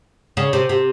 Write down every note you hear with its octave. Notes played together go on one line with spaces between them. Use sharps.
C#3
C3
C3